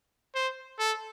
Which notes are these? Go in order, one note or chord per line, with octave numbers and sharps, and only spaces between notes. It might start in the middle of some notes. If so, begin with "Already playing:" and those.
C5
A4